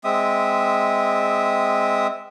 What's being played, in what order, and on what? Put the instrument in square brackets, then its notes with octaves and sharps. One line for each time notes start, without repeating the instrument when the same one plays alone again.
[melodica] G#3 C4 E5 D#6